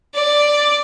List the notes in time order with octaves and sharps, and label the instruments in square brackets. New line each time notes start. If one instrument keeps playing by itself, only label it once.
[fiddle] D5